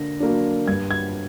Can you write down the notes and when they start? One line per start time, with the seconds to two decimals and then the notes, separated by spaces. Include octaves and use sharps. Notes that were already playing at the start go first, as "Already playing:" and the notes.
Already playing: D3 A#3 D4 A#6
0.20 F#3 A#3 D4
0.67 G2 G#6
0.91 G#6